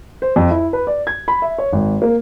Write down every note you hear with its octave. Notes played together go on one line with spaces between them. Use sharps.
C5
F2
E4
B4
D5
G#6
B5
E5
C#5
G#1
A#3